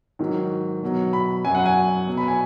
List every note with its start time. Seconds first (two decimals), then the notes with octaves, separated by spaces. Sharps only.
0.19 G#2 D#3 F#3
0.83 B2 F#3
1.13 B5
1.45 F#2 F#3 G#5
1.55 F#5
1.66 G#5
2.07 B2 F#3
2.17 B5
2.28 G#5